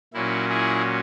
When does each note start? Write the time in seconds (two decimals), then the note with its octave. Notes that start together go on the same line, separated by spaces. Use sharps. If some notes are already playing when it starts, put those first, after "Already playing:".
0.13 A#2 F#3 C#4 E4
0.49 E4 G#4